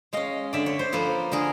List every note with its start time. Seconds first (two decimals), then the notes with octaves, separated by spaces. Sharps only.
0.13 G#3 C#4 D#5 F5
0.53 D3 D5 E5
0.66 C#5
0.79 C5
0.93 F3 A#3 A4 B4
1.32 D3 G#4 A#4